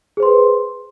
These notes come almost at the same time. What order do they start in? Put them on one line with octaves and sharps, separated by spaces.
G#4 C5 C6 B4